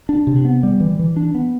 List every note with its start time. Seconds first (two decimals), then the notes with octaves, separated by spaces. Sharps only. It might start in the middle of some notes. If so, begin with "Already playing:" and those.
0.09 D4
0.27 C3
0.45 B3
0.63 G3
0.80 E3
0.99 E3
1.16 D4
1.35 B3